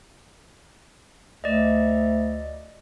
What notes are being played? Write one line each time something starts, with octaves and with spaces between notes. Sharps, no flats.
D2 D5 D#5